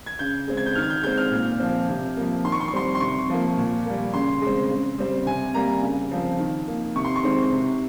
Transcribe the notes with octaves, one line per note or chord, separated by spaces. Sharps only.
G#6
C#3 G6
G#3 C4
G#6
G6
D#3 F6
G#6
G6
G#3 C4 G6
F6
A#2
F3 C4
C3
F3 A#3
D#3 C6
C#6
C6
C#6
G3 C4 C6
C6
C3 C#6
F3 A#3
A#2
G3 A#3
C#3 C6
G#3
C4
C#3
G3 C4
C3 G#5
G3 A#3 A#5
C#3
F3 C4
D#3
A#3
C3 C#6
C6
C#6
D#3 G#3 C4
C3